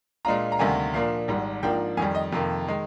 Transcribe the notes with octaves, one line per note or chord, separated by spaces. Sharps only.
A#2 G#3 D4 F4 A#5
A#5
D2 C3 D#3 G3 A#3 G#5
A#2 F3 A#3 D4 F5
G#1 G#2 G3
G#2 F3 A#3 D4 G5
F2 D#3 G3 G#5
D#5
F2 C3 D#3 A#3
D#3 G#3